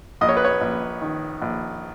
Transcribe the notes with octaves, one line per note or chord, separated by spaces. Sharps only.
A#1 D#5
C#5
B4
C#5
A#1
D#3
A#1